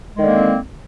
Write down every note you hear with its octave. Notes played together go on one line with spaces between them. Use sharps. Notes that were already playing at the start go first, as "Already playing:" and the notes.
D3 D#3 G#3 A#3 C4